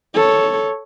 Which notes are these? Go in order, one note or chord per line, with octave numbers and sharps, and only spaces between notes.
A4 C#5